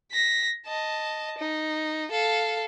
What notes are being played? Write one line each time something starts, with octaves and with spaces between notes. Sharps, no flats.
A#6 B6
D#5 A5
D#4
A4 F5